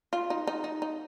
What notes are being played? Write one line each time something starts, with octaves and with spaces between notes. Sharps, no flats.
F4
D#4
D#4
D#4
D#4